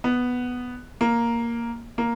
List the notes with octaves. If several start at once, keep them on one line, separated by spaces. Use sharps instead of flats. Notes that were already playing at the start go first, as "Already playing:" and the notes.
B3
A#3
A#3